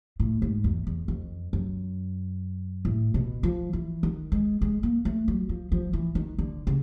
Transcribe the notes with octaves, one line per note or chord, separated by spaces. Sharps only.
A2
G#2
E2
E2
F2
F#2
A2
B2
F3
E3
D#3
G#3
G#3
A#3
A3
F#3
F3
F3
E3
D#3
D3
C#3